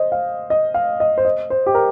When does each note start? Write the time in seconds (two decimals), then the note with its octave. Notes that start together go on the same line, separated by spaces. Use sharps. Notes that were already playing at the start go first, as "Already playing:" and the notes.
Already playing: C5 D#5
0.12 F5
0.50 D#5
0.74 F5
1.00 D#5
1.18 C5
1.25 D#5
1.50 C5
1.66 G4
1.75 A#4